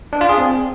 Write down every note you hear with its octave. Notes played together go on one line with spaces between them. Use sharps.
D4
F4
G#4
C4